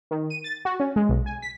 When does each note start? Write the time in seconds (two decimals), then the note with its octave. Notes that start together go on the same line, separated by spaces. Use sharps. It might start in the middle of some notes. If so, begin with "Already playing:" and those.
0.11 D#3
0.30 D#7
0.44 A6
0.65 F#4
0.80 C#4
0.96 G#3
1.09 B1
1.26 G#5
1.42 B6